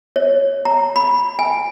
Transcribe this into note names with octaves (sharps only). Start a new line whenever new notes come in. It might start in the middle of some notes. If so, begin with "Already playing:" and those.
C#5
A#5
B5
G#5